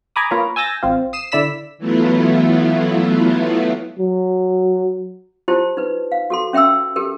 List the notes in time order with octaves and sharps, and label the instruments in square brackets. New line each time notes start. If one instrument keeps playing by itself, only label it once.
[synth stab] G#5 A#5 B5 D6 D#6
A#3 F4 B4 C#5 A#5
G#5 E6 G6 A6 A#6
A1 C4 F4
D#6 C7 E7
D3 E4 D5 B5 E6 B6
[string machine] E3 F#3 A3 B3 E4 F4
[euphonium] F#3
[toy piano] E4 F4 G4 C5 A5
D#4 B4
F5
F#4 A4 C6
C#4 E5 G5 C6 E6
G4 A4 A#4